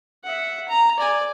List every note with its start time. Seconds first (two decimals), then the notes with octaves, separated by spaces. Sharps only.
0.24 E5 F#5
0.69 A#5
0.98 D5 G#5